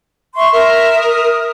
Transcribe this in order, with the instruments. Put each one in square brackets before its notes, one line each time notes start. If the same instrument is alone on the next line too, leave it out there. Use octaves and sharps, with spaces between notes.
[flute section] E5 C6 C#6
[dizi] A#4 [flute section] E5
[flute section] D#6